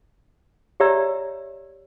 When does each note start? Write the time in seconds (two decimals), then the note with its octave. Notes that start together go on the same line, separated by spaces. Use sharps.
0.80 G4 C#5 D5 E5 A#5 E6